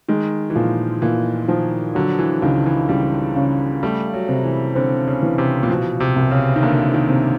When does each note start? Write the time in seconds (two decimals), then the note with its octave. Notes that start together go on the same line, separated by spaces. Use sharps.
0.08 D#3 G#3
0.50 E3
0.55 A#2 F3
1.02 A#2 E3
1.48 D#3 F3
1.95 D3 F#3
2.19 E3
2.42 C#2 D#3
2.66 E3
2.89 C#2 G3
3.36 C#3
3.83 G3 A3
4.14 F#3
4.29 C3
4.44 E3
4.75 D3 C4
5.08 C#3
5.23 E3
5.38 C3
5.63 A#2
5.70 B2 F3
6.00 C3
6.16 C2
6.31 C#3
6.56 D#3
6.63 D3 A#3
6.94 D#3
7.09 C3